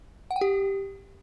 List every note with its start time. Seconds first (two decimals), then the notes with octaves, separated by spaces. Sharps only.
0.31 F#5
0.36 G5
0.41 G4